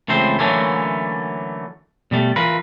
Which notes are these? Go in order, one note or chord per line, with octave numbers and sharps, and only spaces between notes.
C#2 E3 A3 C4 C5
D3 E3 F#3 A3 A#3 C#4
B2 G3 A3
E3 F4 A#4 B4